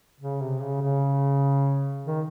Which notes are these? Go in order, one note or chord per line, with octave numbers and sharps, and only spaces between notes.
C#3
C3
C#3
C#3
D#3